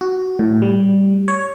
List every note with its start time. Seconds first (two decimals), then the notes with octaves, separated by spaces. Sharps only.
0.01 F#4
0.39 A2
0.62 G3
1.28 C#5